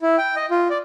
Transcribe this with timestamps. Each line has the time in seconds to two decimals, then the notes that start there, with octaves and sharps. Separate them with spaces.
0.02 E4
0.18 G5
0.36 D#5
0.51 F4
0.70 D5